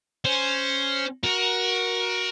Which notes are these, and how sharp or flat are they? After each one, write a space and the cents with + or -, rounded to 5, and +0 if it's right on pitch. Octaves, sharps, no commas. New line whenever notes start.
C#4 +0 C5 +0
F#4 +0 A#4 +20